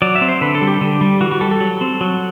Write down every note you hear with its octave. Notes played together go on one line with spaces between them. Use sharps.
F#3 D5
E5
C4
C5
D3 B4
A4
G3
G4
D3
G3
E3 F#4
F#4
G3 A4
A4
F#3
C4
F#3